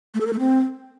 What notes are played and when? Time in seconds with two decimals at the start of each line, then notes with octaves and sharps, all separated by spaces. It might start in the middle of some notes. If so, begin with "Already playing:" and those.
0.14 A3
0.20 A4
0.27 A#4
0.33 A3
0.39 C4